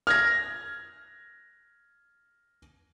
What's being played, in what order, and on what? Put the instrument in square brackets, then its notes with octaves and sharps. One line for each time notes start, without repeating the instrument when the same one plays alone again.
[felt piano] F6 G#6 A#6